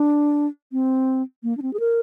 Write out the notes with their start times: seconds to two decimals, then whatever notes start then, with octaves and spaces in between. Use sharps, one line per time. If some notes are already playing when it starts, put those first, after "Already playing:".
Already playing: D4
0.72 C4
1.43 A#3
1.57 D4
1.62 C4
1.73 G#4
1.80 A#4